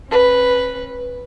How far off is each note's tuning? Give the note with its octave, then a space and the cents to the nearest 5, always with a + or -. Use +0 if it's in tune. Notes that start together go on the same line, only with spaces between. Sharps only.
C#4 -40 B4 +0